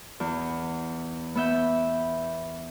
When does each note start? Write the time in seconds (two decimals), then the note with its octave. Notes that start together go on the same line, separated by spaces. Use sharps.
0.20 E2
1.35 B3 E5 G6